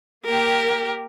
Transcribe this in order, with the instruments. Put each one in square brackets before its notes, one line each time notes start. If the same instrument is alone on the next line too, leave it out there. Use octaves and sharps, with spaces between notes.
[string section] A#3 G4 [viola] A#4